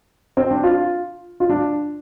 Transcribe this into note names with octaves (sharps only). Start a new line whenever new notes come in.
C4
D4
F4
F4
D4